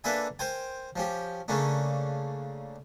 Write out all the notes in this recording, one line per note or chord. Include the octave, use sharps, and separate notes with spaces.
A#3 D4 A4 B4 E5 G#5
A#4 C5 G5 G#5
F3 C#4 G4
C#3 A3 A#3 C#4 D4